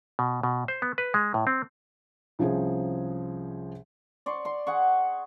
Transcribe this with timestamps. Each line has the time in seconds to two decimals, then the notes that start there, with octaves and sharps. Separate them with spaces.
0.19 B2
0.43 B2
0.68 C5
0.82 B3
0.98 B4
1.14 G#3
1.34 A2
1.47 C4
2.39 C2 F3 C#4 G#4 C5
4.26 D5 C6 C#6
4.45 C6
4.67 G#4 F#5 C#6